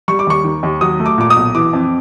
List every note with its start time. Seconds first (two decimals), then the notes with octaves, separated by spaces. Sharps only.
0.08 G3 C#6
0.19 D6
0.27 D#2 C#6
0.44 D#3
0.63 D#2
0.81 F#3 D#6
1.00 A3
1.06 D6
1.18 A#2 D6
1.30 D#6
1.36 B1
1.55 E3 D6
1.73 F2